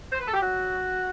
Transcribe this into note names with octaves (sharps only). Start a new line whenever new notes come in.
C5
B4
A4
G4
F#3 F#4